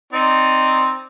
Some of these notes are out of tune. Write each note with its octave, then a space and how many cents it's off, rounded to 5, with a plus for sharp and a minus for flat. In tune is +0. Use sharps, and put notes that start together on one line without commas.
C4 +0 D#4 +0 D5 +0